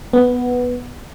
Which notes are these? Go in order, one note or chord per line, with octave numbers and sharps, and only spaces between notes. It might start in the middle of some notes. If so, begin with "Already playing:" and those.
B3